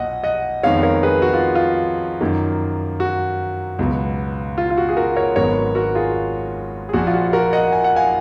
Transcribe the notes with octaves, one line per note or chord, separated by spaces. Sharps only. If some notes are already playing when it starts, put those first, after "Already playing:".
Already playing: B1 A#2 D#5 F#5
D#5 F#5
F2 D#3 G#3 B3 C#5 F5
A#4 C#5
G#4 B4
F#4
F4
F4
F#2 D#3 A#3
F#4
C#2 B2 F#3 B3
F4
F4
F#4
G#4
F#4 A#4
A#4 C#5
G#1 G#2 F#3 B3 A#4 C#5
F#4 A#4
F4 G#4
G#4
A#1 A#2 F3 F#4
F4
F#4
F#4 A#4
D#5 F#5
G#5
F#5
F5 G#5